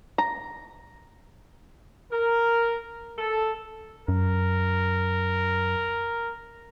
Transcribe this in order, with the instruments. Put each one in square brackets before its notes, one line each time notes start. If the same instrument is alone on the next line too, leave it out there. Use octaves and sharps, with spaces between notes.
[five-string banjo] A#5
[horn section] A#4
A4
[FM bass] F#2 [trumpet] A#4